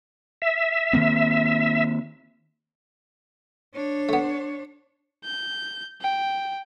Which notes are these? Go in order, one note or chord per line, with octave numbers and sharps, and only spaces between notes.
E5
D#3 A#3 C4
D4 C#5
A3 B3
G6
G5